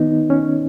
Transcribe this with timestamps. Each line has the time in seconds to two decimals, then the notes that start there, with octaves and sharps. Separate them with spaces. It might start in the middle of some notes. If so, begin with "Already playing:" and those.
Already playing: D#3 B3 D#4
0.30 C#4